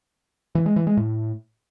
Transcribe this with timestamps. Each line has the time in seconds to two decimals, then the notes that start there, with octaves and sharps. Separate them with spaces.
0.55 E3
0.66 G#3
0.76 E3
0.87 G#3
0.97 A2